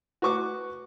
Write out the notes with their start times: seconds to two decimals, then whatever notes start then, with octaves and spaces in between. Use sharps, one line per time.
0.22 F#4 B4 C#6 D6